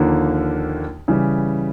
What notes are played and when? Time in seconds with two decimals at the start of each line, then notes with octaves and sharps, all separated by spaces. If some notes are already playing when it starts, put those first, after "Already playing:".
Already playing: D#2 D3 F3 A#3 D#4
1.08 C#3 E3 G3